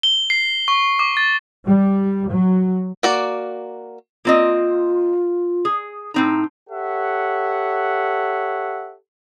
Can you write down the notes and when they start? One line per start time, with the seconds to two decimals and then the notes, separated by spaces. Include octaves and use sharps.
0.03 G7
0.30 C7
0.68 C#6
0.99 D6
1.17 A6
1.66 G3
2.30 F#3
3.03 A#3 F#4 D5
4.25 A#3 C4 F4 D#5
5.65 G#4
6.14 A2 C4 D#4 A#5
6.70 G4 A4 C#5 E5 F#5